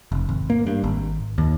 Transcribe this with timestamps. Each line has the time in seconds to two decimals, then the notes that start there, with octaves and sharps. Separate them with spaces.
0.12 F1
0.29 G#1
0.50 A#3
0.67 G2
0.83 G#1
1.38 D#2